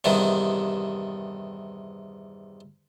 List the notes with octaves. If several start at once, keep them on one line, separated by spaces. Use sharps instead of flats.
E2 G2 C3 D#3